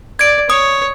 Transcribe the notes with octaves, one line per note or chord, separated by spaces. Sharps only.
D5 G#6 D7
C#5 D#6